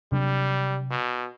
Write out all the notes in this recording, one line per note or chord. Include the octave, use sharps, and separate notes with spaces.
C3 F#3 G3 D4
B2